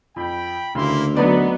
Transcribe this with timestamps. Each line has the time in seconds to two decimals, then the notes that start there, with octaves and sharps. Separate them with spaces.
0.16 F2 G5 B5
0.75 D2 C#3 A#3 E4 C6
1.16 F#3 B3 D#4 B4 D5